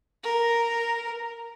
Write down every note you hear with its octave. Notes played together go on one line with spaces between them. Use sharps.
A#4